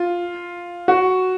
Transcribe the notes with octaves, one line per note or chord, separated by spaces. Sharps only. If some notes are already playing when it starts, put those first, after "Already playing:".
Already playing: F4
F#4